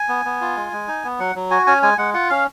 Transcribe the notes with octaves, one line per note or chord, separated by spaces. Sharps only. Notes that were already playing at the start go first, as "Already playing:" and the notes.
Already playing: G#5
B3
B3
F4
G#3
G#3
D#4
B3
F#3 F#5
F#3
F#4 G#5
C#4 G#5
G#3 G#5
G#3 F#5
F4 F#5
C#4 F5